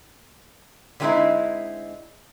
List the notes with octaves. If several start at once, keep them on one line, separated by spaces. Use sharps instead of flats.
D3 F#3 G#3 C4 D#4 E4